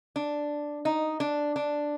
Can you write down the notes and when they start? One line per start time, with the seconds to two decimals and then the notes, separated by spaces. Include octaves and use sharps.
0.16 D4
0.85 D#4
1.20 D4
1.56 D4